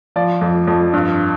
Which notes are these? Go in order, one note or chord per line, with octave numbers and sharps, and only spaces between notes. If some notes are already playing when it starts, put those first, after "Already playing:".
F3 D5
F2
F2
G2